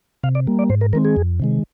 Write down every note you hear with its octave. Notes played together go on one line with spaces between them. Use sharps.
C3 F5
D5
G3 A#3
D5
G#2 C5
A#4
D#3 G#3 C4 A#4
G#4
F2
C3 D#3 G#3